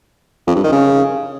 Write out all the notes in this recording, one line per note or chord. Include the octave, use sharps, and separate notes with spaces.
F2
G2
D#3
C#3